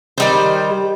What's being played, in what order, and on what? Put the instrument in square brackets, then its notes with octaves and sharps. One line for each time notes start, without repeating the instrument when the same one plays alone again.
[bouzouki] D#3 G3 C5